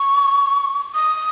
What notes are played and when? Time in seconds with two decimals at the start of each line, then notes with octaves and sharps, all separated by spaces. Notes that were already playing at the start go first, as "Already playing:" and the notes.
Already playing: C#6
0.94 D#6